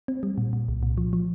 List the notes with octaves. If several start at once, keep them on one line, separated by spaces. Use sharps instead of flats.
C4
G3
A#2
A#2
C2
A#2
F3
F3